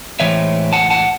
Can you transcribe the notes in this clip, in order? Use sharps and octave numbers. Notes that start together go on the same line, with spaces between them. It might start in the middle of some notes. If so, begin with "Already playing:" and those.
A2 E3 G#3 C4 C#5 E5
F#5 A5
F#5 A5